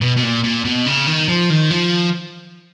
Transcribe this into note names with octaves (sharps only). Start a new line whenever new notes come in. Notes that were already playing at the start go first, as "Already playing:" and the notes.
B2
B2
A#2
A#2
B2
C#3
D#3
F3
D#3
F3